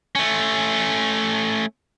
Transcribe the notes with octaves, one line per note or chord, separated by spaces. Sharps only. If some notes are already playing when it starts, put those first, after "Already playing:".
A3 C#4